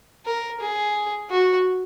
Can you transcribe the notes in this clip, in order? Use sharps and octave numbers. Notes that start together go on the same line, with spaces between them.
A#4
G#4
F#4